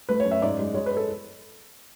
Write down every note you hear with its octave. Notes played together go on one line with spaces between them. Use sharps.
A3 B4
C#5
F#2
E5
G#2 D5
G#3
G#3 C#5
B4
A4